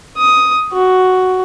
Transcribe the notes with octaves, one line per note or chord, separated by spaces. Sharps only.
D#6
F#4